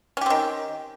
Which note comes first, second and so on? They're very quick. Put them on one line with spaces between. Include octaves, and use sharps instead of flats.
C#4 G4 C4 D#3